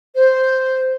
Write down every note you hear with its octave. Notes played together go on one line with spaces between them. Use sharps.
C5